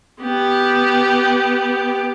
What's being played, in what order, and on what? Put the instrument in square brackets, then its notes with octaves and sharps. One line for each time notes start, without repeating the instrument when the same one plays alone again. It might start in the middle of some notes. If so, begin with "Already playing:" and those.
[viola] B3 G4